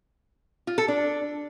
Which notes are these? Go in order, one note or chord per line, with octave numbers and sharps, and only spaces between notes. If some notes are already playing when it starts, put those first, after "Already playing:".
F4
A4
D4